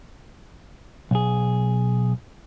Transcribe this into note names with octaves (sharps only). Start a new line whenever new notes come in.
B1 G#4